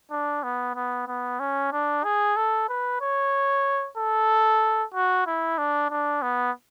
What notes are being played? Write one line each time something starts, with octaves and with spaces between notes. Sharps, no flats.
D4
B3
B3
B3
C#4
D4
G#4
A4
B4
C#5
A4
F#4
E4
D4
D4
B3